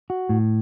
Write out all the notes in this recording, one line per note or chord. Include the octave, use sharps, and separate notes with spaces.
F#4
A2